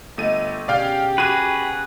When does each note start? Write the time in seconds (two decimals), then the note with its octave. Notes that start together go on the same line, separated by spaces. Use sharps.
0.18 G1 A3 D#5 D#7
0.68 B2 C#4 G4 G#4 D5 F5 G5
1.18 F#4 G#4 B4 A#5 D6 D#7